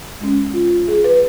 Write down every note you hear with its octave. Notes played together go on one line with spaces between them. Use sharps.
G#3 C#4
F4
G#4
B4